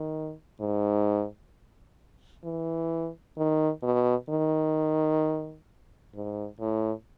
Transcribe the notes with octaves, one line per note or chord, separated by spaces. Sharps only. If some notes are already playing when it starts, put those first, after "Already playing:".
Already playing: D#3
G#2
E3
D#3
B2
D#3
G#2
A2